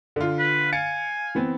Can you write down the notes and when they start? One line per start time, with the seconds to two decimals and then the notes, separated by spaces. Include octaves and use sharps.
0.16 D3 F4
0.39 B4
0.72 F5 G#5 A6 C#7
1.35 E3 B3 C4